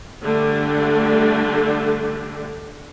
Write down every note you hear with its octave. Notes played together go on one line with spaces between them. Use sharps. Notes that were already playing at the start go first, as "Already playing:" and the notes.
D3 G3 A3 D4